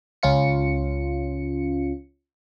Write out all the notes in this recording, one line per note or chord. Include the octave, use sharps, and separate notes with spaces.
C#2 C#4 F4 C#7